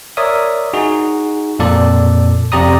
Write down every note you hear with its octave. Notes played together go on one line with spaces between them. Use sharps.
A#4 C#5 D5 E5 D#6
D#4 F#4 G#4
F2 A#2 A4 D5
F2 C3 G4 D5 A#5 D#6